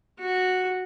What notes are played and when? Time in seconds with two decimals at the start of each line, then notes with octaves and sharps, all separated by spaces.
0.20 F#4